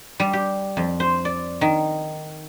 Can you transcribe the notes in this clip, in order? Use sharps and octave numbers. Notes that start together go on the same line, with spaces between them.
G3
G4
F2
C5
D5
D#3